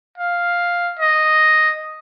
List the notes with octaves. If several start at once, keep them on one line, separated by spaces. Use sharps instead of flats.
F5
D#5